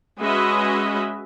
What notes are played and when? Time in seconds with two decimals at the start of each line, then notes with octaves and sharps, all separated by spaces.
0.19 G#3 C#4 F#4 B4 D#5 E5